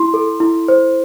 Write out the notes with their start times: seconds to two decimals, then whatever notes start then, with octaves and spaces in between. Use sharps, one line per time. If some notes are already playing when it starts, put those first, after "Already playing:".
Already playing: E4 C6
0.14 A4
0.40 E4
0.68 C5